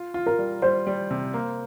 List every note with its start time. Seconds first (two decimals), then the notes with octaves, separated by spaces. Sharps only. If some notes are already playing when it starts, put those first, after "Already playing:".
Already playing: F4
0.14 F4
0.26 A#4
0.38 G3
0.62 G3 C5
0.87 G3
1.11 C3
1.33 A#3